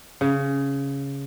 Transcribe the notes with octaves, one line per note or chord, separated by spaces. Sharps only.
C#3